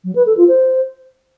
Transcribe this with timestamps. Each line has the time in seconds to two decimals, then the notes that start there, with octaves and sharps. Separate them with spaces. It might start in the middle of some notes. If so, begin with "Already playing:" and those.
0.04 F#3
0.15 B4
0.26 A4
0.37 F4
0.48 C5